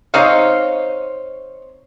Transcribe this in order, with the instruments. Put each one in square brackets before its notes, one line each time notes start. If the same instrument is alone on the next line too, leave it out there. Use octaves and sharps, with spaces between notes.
[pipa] C4 D#4 F5 [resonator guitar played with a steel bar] C5 C#5 D#5